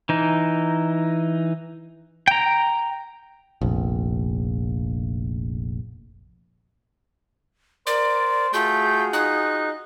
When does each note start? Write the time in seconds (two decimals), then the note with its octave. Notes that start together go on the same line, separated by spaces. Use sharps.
0.09 E3 D#4
2.28 G5 A#5
3.61 F1 A#1
7.87 A#4 C5 D5
8.53 A3 F4 F#4 G#4 G6
9.13 D#4 F#6